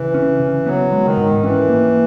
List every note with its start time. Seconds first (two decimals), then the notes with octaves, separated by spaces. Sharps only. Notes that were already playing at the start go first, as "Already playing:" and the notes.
Already playing: C#3 E3
0.14 C#4
0.40 C#3
0.66 F#3 B3
0.92 G#3
1.04 D#3
1.17 G#2
1.43 E3 C#4
1.69 A#3